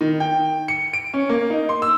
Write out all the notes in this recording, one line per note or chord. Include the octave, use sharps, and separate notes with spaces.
D#3
G5
C#7
D7
C#4
A#3
D#4
C6
E6